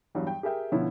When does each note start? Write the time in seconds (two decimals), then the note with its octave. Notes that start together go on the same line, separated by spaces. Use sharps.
0.15 E2 G2 F#3
0.27 G5
0.43 G4 G#4 A#4 E5 G5
0.72 B2 D3 F3 C#4 E4